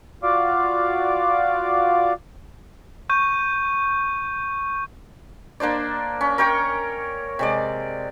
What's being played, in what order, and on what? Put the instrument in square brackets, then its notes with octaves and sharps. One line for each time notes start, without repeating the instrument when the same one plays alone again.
[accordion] F4 F#4 D5 F5 D6
[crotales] C#6 G6 D#7
[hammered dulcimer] A#3 D4 C5 D5
C#4
A#4 C#5 G5 C#6
C3 G#3 D5